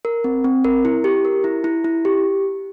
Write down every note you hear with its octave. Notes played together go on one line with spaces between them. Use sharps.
A#4
C4
C4
A#4
E4
G4
A#4
E4
E4
E4
G4